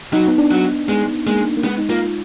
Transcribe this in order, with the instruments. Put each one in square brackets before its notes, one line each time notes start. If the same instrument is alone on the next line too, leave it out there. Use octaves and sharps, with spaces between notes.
[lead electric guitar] F#3 [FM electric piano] D#4
[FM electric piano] B3
D4
[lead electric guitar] F#3
[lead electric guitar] G#3 [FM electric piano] B3
[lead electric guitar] G#3 [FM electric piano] A#3
[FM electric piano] A#3
[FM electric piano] G#3 [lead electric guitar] B3
[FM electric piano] D#4
[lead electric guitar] A#3 [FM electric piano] F4